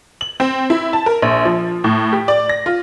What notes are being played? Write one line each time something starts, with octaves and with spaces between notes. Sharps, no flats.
F#7
C4
E4
A5
A#4
A#1
F3
A2
G4
D5
A#6
F4